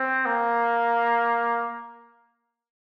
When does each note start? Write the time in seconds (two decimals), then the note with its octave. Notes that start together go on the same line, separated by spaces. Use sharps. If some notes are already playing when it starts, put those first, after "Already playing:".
Already playing: C4
0.25 A#3